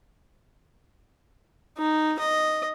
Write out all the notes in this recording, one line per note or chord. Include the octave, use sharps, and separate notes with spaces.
D#4
D#5